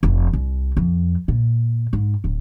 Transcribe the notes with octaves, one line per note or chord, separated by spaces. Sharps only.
F1
C2
F2
A#2
G#2
D1